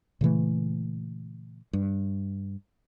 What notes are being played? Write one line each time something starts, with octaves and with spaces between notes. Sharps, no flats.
A#2 C#3 E3 A3
G2